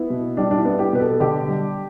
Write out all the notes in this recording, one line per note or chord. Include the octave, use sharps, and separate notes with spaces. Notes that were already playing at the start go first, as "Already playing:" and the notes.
Already playing: B3 E4
B2
G3 D4
D4
E4
B3
G4
B2 B4
A4
D3 G4
G3